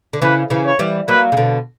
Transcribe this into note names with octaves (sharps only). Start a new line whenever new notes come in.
D3
C#3 E3 B4
C#3 E3
C#5
E3 G3
F#3 A#3 B4
C#3
B2 D3